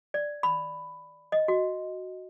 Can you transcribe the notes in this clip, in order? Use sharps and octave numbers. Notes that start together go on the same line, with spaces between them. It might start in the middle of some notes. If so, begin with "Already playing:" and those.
D5
B5
D#5
F#4